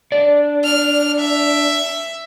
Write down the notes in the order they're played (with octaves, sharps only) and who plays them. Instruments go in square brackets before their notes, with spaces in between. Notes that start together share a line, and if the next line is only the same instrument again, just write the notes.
[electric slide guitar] D4 D5
[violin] F6
E5